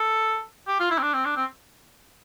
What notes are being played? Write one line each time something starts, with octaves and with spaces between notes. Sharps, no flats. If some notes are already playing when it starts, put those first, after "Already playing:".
Already playing: A4
G4
F4
E4
C4
D4
C4
D4
C4